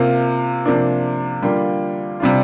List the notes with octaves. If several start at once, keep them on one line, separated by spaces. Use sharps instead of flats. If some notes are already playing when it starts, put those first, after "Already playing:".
Already playing: C3 A#3 F4
C3 F3 A#3 D4
D3 G3 A#3 F4
C3 G3 D4 F4